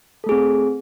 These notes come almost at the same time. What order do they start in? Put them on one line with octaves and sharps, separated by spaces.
A4 A3 G#4 C4